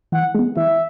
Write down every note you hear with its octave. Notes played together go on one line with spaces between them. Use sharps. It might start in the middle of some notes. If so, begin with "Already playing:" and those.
E3 F#5
G#3 B3
E3 E5